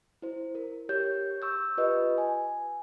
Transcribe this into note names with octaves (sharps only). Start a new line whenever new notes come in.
E4 C5
A#4
G4 C#5 G6
C#6 E6 G6
F4 G4 B4 D#5
G#5